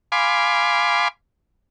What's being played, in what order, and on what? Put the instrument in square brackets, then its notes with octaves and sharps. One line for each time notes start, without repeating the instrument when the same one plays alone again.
[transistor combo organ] F5 G#5 B5 C6 D6